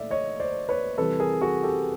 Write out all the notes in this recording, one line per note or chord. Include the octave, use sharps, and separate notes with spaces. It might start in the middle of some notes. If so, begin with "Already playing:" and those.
Already playing: A#2 A3 D5 E5
C#5 D#5
C5 D5
B4 C#5
C3 E3 G3 A4 B4
G#4 A#4
F#4 G#4
G4 A4